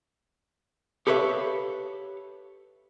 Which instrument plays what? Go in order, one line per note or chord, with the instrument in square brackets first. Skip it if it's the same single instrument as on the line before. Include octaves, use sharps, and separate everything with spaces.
[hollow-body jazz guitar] G4 A4 B4 C#5 E5 F5